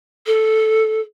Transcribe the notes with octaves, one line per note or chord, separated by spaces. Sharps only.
A4